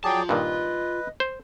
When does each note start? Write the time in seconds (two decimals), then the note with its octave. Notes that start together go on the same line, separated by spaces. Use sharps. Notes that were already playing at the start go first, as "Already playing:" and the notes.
0.04 F#3 F4 G#4 D5 G5 A5
0.29 G2 A#2 D#3 B4 D#5
1.20 C5